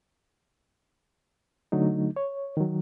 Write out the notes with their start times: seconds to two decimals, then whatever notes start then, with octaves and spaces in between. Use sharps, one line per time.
1.72 D3 F#3 A3 D#4
2.16 C#5
2.57 D#3 F#3